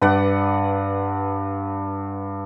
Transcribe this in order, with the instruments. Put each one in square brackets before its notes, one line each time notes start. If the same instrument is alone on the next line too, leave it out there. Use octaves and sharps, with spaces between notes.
[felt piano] G2 [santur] B4 D5 F#5